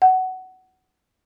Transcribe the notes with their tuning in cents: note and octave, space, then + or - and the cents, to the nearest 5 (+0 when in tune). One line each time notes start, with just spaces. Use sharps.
F#5 +15